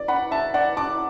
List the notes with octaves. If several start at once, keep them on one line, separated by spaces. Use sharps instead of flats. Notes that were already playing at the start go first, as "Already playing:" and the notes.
Already playing: D5
F#5 B5
E5 A5
D5 F#5
A5 D6